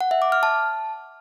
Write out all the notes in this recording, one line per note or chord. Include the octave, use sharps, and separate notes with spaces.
F#5
E5
D6
F6
A5